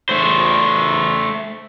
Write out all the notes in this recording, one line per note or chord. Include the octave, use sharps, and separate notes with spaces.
A3 C5